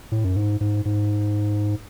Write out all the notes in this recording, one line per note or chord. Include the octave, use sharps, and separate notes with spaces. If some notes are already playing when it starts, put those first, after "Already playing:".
A2
F#2
G#2
G#2
G#2